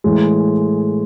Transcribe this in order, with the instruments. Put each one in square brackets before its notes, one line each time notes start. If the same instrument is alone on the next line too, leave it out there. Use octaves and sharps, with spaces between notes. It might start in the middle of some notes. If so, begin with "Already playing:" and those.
[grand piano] A2 E3 G#3